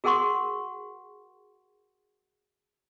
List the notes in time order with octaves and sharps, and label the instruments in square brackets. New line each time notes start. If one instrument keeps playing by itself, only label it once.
[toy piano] F#4 G#4 A#4 F#5 C6 C#6